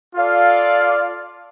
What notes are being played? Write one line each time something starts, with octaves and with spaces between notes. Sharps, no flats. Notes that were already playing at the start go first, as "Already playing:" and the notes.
F4 A4 D5 F5